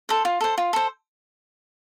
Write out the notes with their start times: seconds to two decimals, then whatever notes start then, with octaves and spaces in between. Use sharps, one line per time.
0.09 A4 C5
0.25 F4
0.41 A4 C5
0.58 F4
0.73 A4 C5